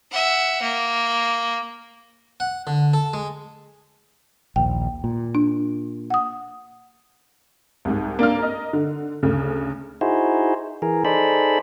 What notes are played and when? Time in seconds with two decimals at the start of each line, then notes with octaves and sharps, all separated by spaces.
0.11 E5 F#5
0.62 A#3
2.40 F#5
2.67 D3
2.94 A4
3.14 G#3
4.56 A#1 D#2 G5
5.04 A#2
5.35 D4
6.10 F#5 D#6
7.85 C2 G#2
8.19 A#3 D4 F5 F6
8.39 A#4 D#5
8.73 D3
9.23 D2 C#3
10.01 D#4 E4 F#4 G#4 C5
10.82 E3 G#4 A#4
11.05 D#4 G#4 A4 C5 D5 B5